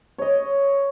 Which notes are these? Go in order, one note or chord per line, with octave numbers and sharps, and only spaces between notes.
C#5 D#5